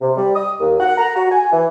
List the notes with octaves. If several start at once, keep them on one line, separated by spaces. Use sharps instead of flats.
C3
G3
D#6
D#2
F#5
A#5
F#4
G#5
E3